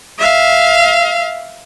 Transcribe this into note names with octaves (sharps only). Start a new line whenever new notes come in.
E5 F5